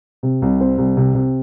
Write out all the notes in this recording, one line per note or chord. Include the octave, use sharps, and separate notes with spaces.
C3
C2
C4
C2
C3
C3